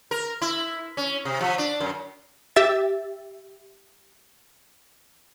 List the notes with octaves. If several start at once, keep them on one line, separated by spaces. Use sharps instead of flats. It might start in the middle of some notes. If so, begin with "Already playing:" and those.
A#4
E4
C#4
C3
F3
D4
F#2
G4 E5 A6